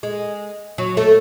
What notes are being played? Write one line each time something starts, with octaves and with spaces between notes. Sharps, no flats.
G#3
F#3
A3